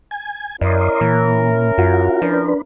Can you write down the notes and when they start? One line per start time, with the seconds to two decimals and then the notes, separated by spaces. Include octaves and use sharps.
0.11 G#5
0.61 F#2 C#4 E4 A#4 D5 D#5 C6
1.01 A#2 E3
1.78 F#2 F4 F#4
2.22 F3 D4 B4